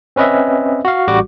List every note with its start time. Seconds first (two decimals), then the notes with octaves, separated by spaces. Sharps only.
0.16 C4 C#4 B4 D#5 E5
0.85 F#4 F5
1.08 A1 G3 F#4 D6